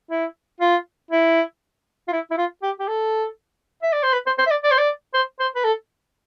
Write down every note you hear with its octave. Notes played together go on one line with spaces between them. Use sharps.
E4
F4
E4
F4
E4
E4
F4
G4
G4
A4
E5
D5
C5
B4
C5
C5
E5
D5
D5
C5
D5
C5
C5
B4
A4